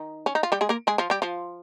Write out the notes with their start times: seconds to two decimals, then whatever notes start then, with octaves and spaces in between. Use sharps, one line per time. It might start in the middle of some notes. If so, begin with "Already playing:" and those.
Already playing: D#3 D#4
0.26 C#4
0.35 D#4
0.43 F4
0.52 G3 G4
0.61 G#3 G#4
0.69 A#3 A#4
0.87 G#3 G#4
0.98 F3 F4
1.10 G3 G4
1.22 F3 F4